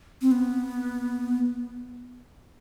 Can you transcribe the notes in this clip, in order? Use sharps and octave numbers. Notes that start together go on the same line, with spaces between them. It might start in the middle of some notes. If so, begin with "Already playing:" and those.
C4
B3